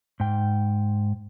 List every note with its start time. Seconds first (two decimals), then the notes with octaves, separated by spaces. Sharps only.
0.20 G#2 G5